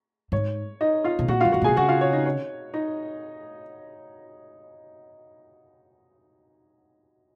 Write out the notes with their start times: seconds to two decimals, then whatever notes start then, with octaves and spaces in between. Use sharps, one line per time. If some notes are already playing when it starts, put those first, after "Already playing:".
0.32 G#2 C#5
0.81 D#4 D#5
1.04 F4 F5
1.19 B2
1.28 A#2 F#4 F#5
1.41 F#2 F4 F5
1.52 G#2 F#4 F#5
1.62 A#2
1.64 B2 G#4 G#5
1.77 C#3 F#4 F#5
1.89 F4 F5
2.01 C#5
2.13 D#4 D#5
2.26 C#5
2.74 D#4 D#5